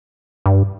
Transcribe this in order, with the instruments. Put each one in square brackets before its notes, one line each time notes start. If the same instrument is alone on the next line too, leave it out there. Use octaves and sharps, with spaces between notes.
[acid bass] G2